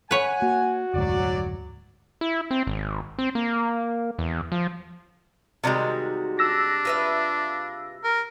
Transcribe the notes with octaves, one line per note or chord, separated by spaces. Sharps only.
B4 C#5 F#5 G#5
A#3 F#4
F1 D2 G#2 F#3 D5
E4
C4
G#1
C4
A#3
E2
F3
C3 D#3 G3 G#3 F#4
D4 E6 A#6
F4 B4 E5
A#4